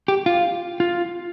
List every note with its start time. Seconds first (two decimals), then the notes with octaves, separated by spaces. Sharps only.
0.08 G4
0.26 F4
0.80 F4